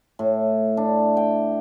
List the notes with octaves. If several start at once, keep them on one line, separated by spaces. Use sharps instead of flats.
A2
D4
G5